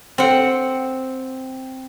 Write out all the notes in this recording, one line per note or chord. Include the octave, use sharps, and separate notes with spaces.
C4 F#5